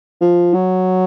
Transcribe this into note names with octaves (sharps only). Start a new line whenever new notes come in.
F3
F#3